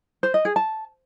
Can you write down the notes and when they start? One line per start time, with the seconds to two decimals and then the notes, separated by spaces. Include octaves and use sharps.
0.23 C5
0.34 D#5
0.45 G#4
0.56 A5